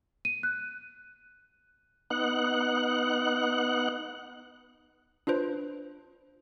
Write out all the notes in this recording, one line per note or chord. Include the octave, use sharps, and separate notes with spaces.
D#7
F#6
B3 D#4 F#5 F#6
D4 F4 B4 C5